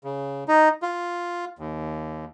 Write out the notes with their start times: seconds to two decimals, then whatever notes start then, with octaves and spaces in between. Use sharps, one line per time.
0.04 C#3
0.48 D#4
0.82 F4
1.59 D#2